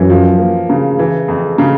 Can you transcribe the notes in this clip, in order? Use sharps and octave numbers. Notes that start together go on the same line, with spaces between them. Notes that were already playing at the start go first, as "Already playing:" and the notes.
Already playing: F#2 E3
F3
A#3
C#3
E3
F2
C#3